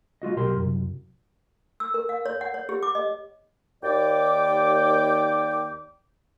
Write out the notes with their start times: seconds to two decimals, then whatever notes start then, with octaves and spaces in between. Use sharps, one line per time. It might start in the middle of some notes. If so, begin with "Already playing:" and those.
0.22 G#3 F4 F#4 D#5
0.37 B1 G4 A#4 C6
0.57 C2 F#2
1.80 E6
1.94 A#4
2.09 F5
2.26 C#5
2.41 F#5
2.54 C#5
2.69 G4
2.83 D6
2.95 D#5
3.83 D#2 D5 G5 D6